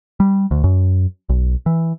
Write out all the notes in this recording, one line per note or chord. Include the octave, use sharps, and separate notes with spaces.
G3
D2
F#2
B1
E3